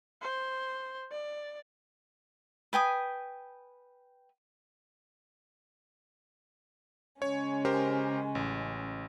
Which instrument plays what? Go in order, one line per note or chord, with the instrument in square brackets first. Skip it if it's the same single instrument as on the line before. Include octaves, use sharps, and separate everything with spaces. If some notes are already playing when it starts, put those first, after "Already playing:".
[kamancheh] C5
D5
[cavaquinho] B4 G5 G#5 D#6
[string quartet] C#3 G#3 C#4 [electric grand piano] C#5
[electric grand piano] G4 A#4 C5
A1